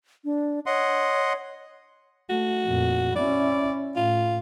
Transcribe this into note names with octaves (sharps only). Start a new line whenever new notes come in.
D4
C#5 D#5 F#5 C6
A3 F#4
F2 A#2
C#4 E4 D5
A2 F4